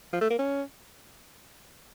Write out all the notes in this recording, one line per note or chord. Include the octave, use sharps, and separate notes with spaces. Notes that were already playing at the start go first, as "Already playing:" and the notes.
F3
A3
A#3
C#4